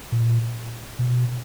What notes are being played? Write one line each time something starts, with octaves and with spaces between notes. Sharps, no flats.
A#2
B2